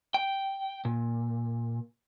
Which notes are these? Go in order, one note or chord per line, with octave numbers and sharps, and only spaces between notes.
G5
A#2